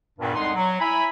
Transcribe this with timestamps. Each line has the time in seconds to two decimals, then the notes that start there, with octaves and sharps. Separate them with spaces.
0.19 E2 G2 A#2 D#3
0.35 C2 F2 G#3 D#4 F#5 C6
0.55 F#3
0.80 E4 E5 G#5 A#5 B5